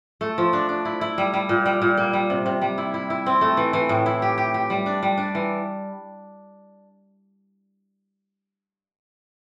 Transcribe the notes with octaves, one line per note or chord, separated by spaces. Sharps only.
A3
F3
D4
D4
E4
E4
G3
G3
A#2
G3
A#2
A#3
G3
C3
C3
G3
E4
E4
E4
C4
A3
E3
E3
A2
E4
G4
G4
G4
G3
D4
G3
D4
E3